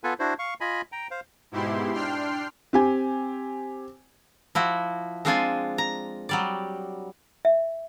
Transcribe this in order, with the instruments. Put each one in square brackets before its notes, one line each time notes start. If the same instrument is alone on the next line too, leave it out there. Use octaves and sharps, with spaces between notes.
[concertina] B3 F4 A4 B4 G#5
D4 E4 F#4 C5
F5 C#6
F4 D#5 G#5 B5
G5 A#5
C5 F5
[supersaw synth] G#2 B2 E4 G4 C6
D4 G5 C6 F6 C7
[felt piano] C4 G4 G#5
[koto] F3 E4 F#4
G#3 C4 D4 F4 C5 G#5
A#5
F#3 G3 D5
[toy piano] E5